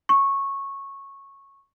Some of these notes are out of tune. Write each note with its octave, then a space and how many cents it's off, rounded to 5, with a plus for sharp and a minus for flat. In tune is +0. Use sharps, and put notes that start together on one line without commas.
C#6 -15